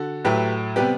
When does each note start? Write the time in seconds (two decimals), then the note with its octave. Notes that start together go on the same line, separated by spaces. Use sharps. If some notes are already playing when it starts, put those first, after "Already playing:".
Already playing: D3 F#4 A4
0.25 A2 F#3 A3 G4 B4
0.76 C3 G3 B3 G4 B4